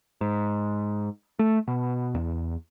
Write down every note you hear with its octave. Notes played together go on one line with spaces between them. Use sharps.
G#2
A3
B2
E2